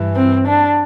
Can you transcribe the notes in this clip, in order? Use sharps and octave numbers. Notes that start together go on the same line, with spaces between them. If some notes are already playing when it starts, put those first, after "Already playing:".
Already playing: G2 E3
C4
D4